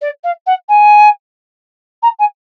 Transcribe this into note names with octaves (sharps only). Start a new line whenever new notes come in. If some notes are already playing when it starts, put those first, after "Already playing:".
D5
F5
F#5
G#5
A#5
G#5